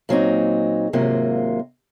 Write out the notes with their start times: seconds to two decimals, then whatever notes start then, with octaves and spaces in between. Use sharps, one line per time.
0.09 A#2 F#3 C4 D#4
0.93 D#2 G#2 C3 F#3 A#3 F4